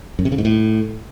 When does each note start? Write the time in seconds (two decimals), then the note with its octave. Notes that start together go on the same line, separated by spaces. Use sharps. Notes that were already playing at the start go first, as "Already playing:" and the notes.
0.19 F#2
0.25 C3
0.32 C#3
0.38 G#2
0.45 A2